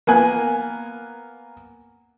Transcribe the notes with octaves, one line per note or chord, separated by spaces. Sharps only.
A#3 B3 G#5 F#6